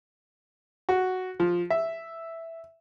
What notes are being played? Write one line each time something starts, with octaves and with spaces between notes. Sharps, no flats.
F#4
F3
E5